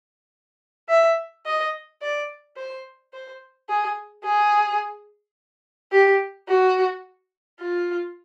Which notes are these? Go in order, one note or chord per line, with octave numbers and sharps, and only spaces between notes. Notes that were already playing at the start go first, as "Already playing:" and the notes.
E5
D#5
D5
C5
C5
G#4
G#4
G4
F#4
F4